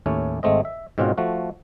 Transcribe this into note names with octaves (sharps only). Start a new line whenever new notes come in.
D#2 A2 A3 C#4
G#1 G#3 A3 C4 D#5
E5
G#2 B2 C4 C#4 F4 F#4
F3 A3 F#4